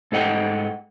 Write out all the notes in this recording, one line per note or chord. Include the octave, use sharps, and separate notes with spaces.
G#2 A4 D#5 F#5 G5